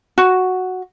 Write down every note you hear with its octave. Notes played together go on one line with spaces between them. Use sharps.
F#4